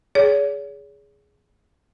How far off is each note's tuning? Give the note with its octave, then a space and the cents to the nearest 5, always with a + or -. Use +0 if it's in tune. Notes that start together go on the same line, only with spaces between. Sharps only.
G#4 +0 C#5 +40